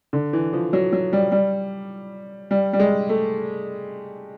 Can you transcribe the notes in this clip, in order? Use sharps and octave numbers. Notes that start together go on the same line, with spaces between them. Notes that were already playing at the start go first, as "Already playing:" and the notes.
D3
E3
F3
F#3
F#3
G3
G3
G3
G3
G#3
A3